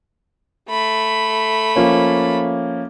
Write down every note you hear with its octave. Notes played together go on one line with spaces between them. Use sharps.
A3 B5
F3 A#3 C#4